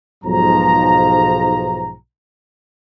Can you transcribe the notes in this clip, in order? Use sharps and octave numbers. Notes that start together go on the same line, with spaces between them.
B1 G#2 F3 A#5